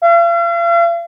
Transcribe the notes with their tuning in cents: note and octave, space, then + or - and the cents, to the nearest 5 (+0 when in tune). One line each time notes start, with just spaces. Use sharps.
F5 -45